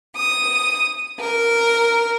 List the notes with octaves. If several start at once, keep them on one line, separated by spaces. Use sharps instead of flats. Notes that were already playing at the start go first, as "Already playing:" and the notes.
D#6
A#4